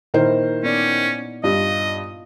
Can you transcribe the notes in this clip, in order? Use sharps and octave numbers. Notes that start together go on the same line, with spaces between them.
A#2 D#3 E4 A#4 C5
B3 C#4 D#4 D5
G2 F4 D#5